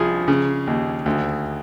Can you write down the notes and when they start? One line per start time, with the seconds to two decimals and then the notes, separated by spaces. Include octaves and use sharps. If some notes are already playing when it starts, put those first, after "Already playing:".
Already playing: C2 F3 G#4
0.28 C#3
0.67 D#2
1.06 D2